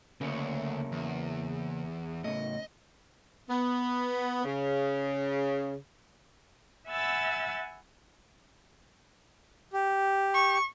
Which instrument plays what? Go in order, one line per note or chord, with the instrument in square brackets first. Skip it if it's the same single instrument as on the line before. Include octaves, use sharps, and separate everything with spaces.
[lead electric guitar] D2 [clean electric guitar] C#3 A#3 C#4
[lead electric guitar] E2
[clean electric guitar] A2 C#3 [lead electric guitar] D#5
[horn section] B3
C#3
[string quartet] E5 F#5 G#5 B5 E6 A6
[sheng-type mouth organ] G4
[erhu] C#6